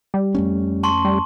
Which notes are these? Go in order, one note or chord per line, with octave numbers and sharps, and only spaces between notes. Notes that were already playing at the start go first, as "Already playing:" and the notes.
G3
F2 A3 C#4
A5 C6 C#6
G3